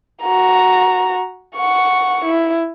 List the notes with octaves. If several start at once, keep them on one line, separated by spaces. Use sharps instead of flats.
F#4 A#5
F#5 C#6
E4